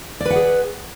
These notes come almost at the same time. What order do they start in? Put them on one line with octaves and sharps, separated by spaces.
D5 B4 F#5 G#4